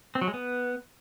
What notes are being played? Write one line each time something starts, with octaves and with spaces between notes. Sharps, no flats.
C4
F#3
G#3
B3